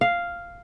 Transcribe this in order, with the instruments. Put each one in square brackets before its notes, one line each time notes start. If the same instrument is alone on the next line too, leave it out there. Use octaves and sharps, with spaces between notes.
[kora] F5